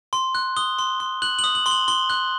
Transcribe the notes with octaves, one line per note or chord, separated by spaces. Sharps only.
C6
F#6
D#6 G7
C6
C6
F#6 F#7
F#7
D#6
F#7
C6 G7
F#7
C6 G7
F#6